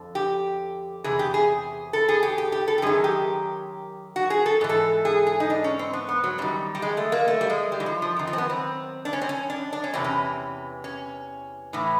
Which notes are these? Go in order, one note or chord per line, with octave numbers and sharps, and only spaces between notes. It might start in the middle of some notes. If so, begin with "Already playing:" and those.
Already playing: F2 D3
G4
E2 C3 G#4
G4
G#4
A4
G#4
G4
G4
G4
A4
G4
F#2 D#3 G#4
G4
F#4
G#4
A4
G#2 E3
A4
G#4
G#4
D#4
D4
C#4
C4
B3
B3
F#3
F#2 D#3 G3
G3
G#3
A3
A#3
A3
G3
G#3
G3
E3
F3
F3
F#2 D#3
F3
C4
B3
C4
D4
C#4
C4
C#4
D4
D4
C#4
E2 C3 E3 C4
C#4
C#4
A2 E3